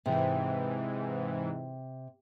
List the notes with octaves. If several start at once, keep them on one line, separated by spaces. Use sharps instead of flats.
G#2 C3 E3